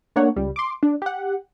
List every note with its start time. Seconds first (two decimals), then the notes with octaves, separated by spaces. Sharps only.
0.16 A3 A#3 D4 C#5 F#5
0.36 C#2 G3
0.56 C6 D6
0.83 D4
1.02 G4 F#5